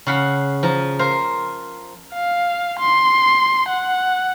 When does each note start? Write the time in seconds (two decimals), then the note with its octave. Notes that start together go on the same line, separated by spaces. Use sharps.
0.07 C#3 F5 F#5 B5
0.63 F3 A#5
0.99 A#4 C5 F5
2.13 F5
2.79 C6
3.68 F#5